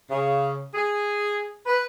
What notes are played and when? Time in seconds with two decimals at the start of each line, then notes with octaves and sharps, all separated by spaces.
0.10 C#3
0.75 G#4
1.66 B4